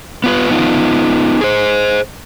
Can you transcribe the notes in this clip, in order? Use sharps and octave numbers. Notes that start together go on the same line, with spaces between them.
B3 F4 B4
B3 D#4 F4
G#4 C5